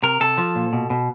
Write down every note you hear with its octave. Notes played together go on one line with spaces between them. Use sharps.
C3 A#4
C3 A4
F3
A#2
B2
B2